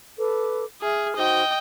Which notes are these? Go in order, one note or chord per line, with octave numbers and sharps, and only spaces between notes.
A4 B4 D6
G#4 E5 F6
D#4 F#4 C5 D#5 G5